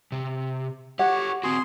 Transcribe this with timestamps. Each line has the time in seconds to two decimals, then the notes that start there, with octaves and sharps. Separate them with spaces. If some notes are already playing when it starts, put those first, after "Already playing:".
0.12 C3
0.99 F#4 G4 A4 C#5 F#5
1.43 C4 F#4 G#4 C6